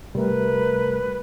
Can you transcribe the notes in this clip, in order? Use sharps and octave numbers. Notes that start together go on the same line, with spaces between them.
C3 G3 A3 A#4 B4